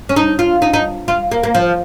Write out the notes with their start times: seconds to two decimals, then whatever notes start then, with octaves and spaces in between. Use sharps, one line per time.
0.09 C#4
0.16 D#4
0.39 F4
0.62 D#4
0.74 D#4
1.08 F4
1.32 A#3
1.43 A#3
1.55 F3